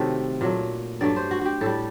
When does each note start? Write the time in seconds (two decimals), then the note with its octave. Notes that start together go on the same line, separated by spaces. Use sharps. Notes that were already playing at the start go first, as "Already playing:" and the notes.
Already playing: C3 D#3 F#3 A3 A4
0.41 A#2 F#3 A3
1.01 G2 F#3 A3 D5
1.16 C5
1.31 F#4
1.41 F#4 G4
1.61 A2 G3 A4